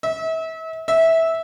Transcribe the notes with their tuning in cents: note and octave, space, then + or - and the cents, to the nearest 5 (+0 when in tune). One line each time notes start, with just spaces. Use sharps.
E5 -35
E5 -15